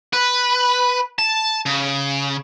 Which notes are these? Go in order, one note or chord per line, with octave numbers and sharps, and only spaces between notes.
B4
A5
C#3